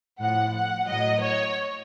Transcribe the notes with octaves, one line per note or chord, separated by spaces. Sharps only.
A2 F3 F#5
F#5
A2 F#3 D#5
C#5